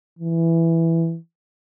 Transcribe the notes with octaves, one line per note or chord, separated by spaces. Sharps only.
E3